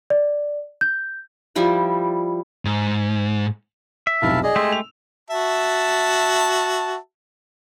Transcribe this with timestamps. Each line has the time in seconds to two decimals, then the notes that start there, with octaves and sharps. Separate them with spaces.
0.10 D5
0.81 G6
1.55 F3 G3 E4 D5
2.65 G#2
4.07 E5
4.22 F1 B1 C3 E4 F5 A5
4.43 G#4 D5 D#5
4.56 G#3 A3 G4 C6 E6
4.72 F7
5.30 F#4 E5 A5